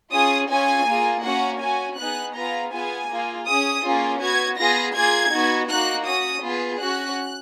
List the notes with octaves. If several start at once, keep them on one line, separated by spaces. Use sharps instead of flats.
C#4 F4 G#4 D#6
C#4 F4 G#4 G#5
A#3 F4 G#4
A#3 C#4 F#4 F#5
C#4 F#4 G#5
B3 D#4 G#4 F#6
B3 F4 G#4 A#5
B3 F4 G#4 G#5
A#3 F4 G#4
C#4 G#4 D#6
A#3 C#4 F4 G#4
B3 F#4 G#6
B3 F4 G#4 A#6
A#3 F4 G#4 G#6
B3 D#4 F#4
A#3 D#4 F#4 F#6
C#4 F#4 D#6
B3 F4 G#4
C#4 F#4 F#6